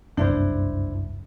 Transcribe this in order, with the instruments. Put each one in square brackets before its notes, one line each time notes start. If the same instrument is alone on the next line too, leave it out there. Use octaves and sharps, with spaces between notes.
[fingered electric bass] F#1 C2 G2 [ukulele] D4 E4 C5